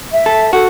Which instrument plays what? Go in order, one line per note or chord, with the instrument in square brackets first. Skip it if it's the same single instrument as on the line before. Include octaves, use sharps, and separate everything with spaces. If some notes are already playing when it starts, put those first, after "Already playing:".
[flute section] E5
[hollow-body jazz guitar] A4
[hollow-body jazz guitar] F#4 [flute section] A4